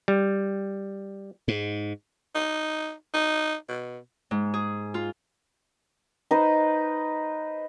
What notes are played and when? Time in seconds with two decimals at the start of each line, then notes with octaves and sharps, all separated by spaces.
0.08 G3
1.48 G#2
2.35 D#4
3.14 D#4
3.69 B2
4.31 G#2
4.54 G#4
4.94 F4
6.31 D#4 B4 C5 D#5